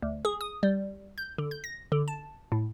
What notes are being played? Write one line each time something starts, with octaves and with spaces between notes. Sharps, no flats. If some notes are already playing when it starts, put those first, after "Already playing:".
D2
G#4
D#6
G3
G6
D3
G6
A#6
D3
A5
A2